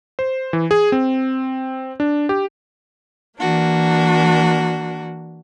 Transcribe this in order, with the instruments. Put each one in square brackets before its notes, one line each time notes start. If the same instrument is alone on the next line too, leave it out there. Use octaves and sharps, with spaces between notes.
[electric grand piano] C5
E3
G#4
C4
D4
G4
[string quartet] E3 A#3 D4 F#4